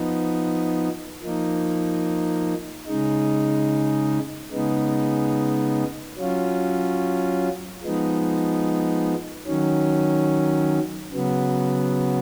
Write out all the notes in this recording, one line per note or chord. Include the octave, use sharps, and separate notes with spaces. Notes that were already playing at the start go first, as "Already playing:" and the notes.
Already playing: F3 B3 D#4
F3 A#3 D#4
C#3 G#3 D#4
C#3 G#3 B3 D#4
F#3 C#4 F4
F3 G#3 B3 D#4
D#3 F#3 C#4
C#3 F#3 B3